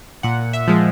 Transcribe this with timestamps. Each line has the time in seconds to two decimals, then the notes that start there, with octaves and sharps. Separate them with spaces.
0.23 A#2 F#5
0.53 E5
0.68 F3 G#3